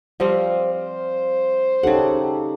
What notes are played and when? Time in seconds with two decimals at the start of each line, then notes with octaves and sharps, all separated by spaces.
0.20 F3 G3 C4 F5
0.70 C5
1.83 C#3 D#4 G4 A4 F#5